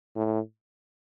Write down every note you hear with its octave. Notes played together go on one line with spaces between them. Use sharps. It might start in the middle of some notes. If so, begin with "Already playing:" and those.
A2